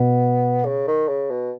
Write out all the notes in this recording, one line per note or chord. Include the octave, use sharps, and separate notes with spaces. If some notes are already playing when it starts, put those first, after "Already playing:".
Already playing: B2 B3
C#3
D#3
C#3
B2